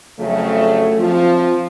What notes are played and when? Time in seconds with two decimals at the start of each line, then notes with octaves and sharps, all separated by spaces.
0.19 F2 C#3 F#3 A3
0.99 F3 C4 F4